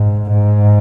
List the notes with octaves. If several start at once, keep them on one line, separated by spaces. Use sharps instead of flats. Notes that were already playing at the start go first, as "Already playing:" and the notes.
Already playing: G#2
G#2